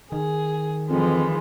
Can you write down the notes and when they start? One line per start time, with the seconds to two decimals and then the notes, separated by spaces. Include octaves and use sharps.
0.12 D#3 G#4
0.89 F2 E3 F3 G#3